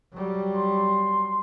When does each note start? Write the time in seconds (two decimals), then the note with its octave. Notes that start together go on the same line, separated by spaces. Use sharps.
0.14 F#3 G3
0.56 C6